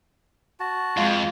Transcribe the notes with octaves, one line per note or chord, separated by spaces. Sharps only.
F#4 A5
F2 G#3 F4 F5 C6